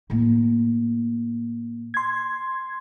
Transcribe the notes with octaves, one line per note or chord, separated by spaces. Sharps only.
A2 A#3
C6 G#6